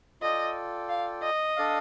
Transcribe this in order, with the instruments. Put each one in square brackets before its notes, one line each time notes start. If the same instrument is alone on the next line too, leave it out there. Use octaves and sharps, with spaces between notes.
[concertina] F4 A4 D5 G5 [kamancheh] D#5
[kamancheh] F5
D#5
[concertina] D4 A4 D5 F5